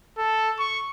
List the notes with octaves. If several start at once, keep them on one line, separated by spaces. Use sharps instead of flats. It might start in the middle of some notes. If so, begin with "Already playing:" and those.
A4
C#6